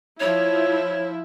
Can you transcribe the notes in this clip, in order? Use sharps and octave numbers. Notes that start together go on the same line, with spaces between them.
F3 E4 C#5